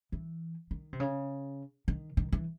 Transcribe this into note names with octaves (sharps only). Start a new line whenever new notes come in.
E3
D#3
C3
C#3
D#3
D#3
E3